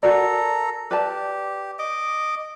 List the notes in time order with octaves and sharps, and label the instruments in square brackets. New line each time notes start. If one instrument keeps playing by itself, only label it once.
[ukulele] F#4 A#4 D5 [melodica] A4 A#5
[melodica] G4 [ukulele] B4 D5 A5
[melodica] D#5 D6